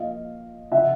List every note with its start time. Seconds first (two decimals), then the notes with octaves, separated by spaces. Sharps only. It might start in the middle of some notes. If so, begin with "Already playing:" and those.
Already playing: A#2 F3 D#5 F5
0.72 C#3 F3 E5 F#5